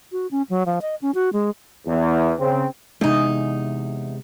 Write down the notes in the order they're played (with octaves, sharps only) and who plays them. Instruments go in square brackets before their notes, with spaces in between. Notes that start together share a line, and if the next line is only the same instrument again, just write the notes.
[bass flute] F#4
C#4
F#3
F3
D#5
C#4
F#4
G#3
[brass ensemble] E2
C#3 C4
[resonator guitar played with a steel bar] E2 D#4 [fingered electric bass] C3 G#3